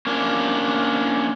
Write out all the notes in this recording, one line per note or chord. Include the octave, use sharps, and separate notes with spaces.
A#3 C#4 D4